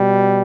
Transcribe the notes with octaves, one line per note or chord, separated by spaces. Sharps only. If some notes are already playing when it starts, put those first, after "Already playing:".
Already playing: B2 G3